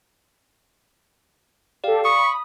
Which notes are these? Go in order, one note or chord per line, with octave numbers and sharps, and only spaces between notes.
G4 A4 D5 F5
B5 C#6 D#6